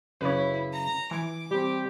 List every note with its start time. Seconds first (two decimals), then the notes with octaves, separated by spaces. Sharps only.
0.21 F#2 C#3 E4 B4 C#5
0.72 A#5
1.11 E3 G#5 D6
1.51 G3 C4 G4